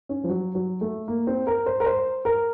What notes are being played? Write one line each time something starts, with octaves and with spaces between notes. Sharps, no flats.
C#4
F3
F#3
F#3
A3
A#3
C4
A#4
C5
A#4
C5
A#4